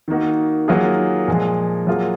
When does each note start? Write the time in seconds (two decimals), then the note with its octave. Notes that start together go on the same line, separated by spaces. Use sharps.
0.08 D#3 A#3 D#4 F#4
0.68 D#3 F#3 A#3 F4 G#4
1.28 A#2 F3 G#3
1.87 F#3 A#3 F4 G#4